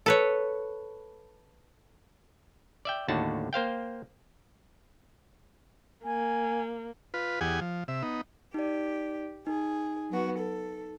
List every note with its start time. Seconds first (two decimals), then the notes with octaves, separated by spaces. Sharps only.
0.06 A4 B4 C#5
2.85 D5 E5 G5
3.08 D#2 A2 D3 F#4 A5
3.53 A#3 C5 F5 G5
6.04 A#3 G#5
7.14 F4 B4
7.41 E2 G4 G#4 F#5 G#5
7.61 F3
7.88 C3 E5
8.03 B3 D#4
8.54 D#4 G4 D5
9.47 D#4 G#4
10.10 F#3 B3 F#4
10.38 A4